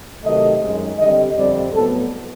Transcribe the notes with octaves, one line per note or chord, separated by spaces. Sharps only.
C3 D#3 F#3 A3 D#5
F#2 D#3 G#3
D3 G3 C4 D#5
F2 D3 G3 C4 D5
A2 F#3 B3 A4